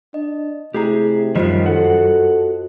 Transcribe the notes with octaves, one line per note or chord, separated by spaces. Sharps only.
D4 D#5
C3 A3 E4 G4 G#4 A#5
F#2 D#3 F3 G3 F4 C5 D#5
F#4 A4 F#5